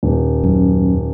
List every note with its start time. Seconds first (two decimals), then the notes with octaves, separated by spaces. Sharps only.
0.03 D#1
0.44 F#2